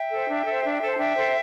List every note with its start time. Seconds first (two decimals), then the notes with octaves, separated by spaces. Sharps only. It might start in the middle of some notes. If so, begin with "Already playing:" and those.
Already playing: E5 G5
0.10 A4 C5
0.28 D4
0.45 A4 C5
0.63 D4
0.81 A4 C5
0.92 A5
0.98 D4 E5 G5
1.16 A4 C5